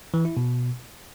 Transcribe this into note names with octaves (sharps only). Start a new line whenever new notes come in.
E3
E4
B2